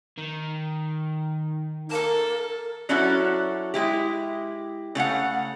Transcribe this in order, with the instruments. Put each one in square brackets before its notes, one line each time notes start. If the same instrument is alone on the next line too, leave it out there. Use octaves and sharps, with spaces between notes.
[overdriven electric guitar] D#3
[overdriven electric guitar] A4 A5 [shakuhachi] A#4
[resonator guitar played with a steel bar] F#3 C#4 D4 E4 F#4 A4
G#3 E4 G4
C#3 A3 F5 F#5